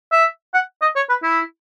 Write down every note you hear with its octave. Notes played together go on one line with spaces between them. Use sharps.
E5
F#5
D#5
C#5
B4
E4